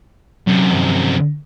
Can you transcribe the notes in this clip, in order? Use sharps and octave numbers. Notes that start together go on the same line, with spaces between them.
F#2 C3 F#3
G2 D#3 F3